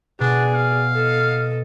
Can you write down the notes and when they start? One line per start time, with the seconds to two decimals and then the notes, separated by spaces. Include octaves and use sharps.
0.20 B2 D4 G#4 D5
0.55 F5
0.93 A4 D#5